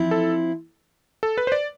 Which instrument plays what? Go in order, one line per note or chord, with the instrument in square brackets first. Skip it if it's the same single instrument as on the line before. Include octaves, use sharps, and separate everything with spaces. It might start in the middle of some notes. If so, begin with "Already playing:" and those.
Already playing: [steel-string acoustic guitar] F3 C4 E4
[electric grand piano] A4
A4
B4
C5
D5